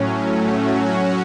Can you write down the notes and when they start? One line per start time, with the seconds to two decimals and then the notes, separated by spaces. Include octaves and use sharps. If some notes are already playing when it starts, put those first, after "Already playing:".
Already playing: A2 F#3 C#4
0.23 A2 F#3 A3 C#4
0.67 F#3 C#4 F#4